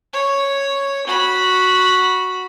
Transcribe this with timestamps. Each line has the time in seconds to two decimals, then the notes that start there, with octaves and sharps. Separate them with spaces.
0.13 C#5
1.07 F#4 B5